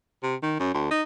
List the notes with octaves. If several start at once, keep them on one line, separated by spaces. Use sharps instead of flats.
C3
D#3
F#2
D2
D#4